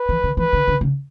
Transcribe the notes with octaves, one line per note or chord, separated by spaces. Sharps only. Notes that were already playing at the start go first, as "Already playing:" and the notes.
Already playing: B4
E3
D3
E3 B4
D3
D3
C#3